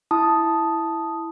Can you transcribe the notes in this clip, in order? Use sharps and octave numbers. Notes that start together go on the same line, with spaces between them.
E4 A5 D#6